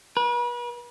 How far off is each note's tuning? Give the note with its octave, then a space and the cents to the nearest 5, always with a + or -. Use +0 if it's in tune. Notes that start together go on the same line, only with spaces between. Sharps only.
B4 -40